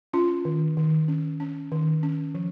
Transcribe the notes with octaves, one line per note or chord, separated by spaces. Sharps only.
C#4 F4
D#3
D#3
C#4
C#4
D#3
C#4
F3